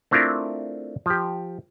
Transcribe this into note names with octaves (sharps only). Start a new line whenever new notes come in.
A3 C4 D4 E4 F4 A#4
F3 G4